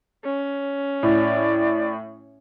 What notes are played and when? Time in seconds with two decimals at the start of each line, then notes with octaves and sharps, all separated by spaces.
0.24 C#4
1.03 A2 D5